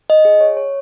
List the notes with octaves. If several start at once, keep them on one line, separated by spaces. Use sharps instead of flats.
D#5
G#4
C#5
C#5